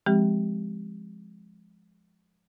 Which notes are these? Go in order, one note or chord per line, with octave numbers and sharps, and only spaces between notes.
F3 G#3 C4 G4